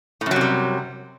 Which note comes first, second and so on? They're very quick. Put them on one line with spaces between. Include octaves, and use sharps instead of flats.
A2 F#2 F#3 C3 G3